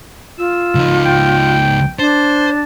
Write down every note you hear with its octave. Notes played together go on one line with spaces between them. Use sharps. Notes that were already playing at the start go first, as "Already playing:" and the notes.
F4 E6
C#2 D#4
G5
D4 C5 A5